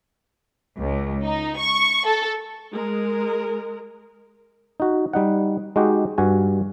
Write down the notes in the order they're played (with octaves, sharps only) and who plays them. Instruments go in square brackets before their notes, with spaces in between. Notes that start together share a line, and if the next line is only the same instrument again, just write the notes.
[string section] C#2
D#4
C#6
A4
[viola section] G#3 A#4
[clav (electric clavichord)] D#4 F#4
G3 D#4 F#5
G#3 D#4 F#4 G4
G2 F#4 G#5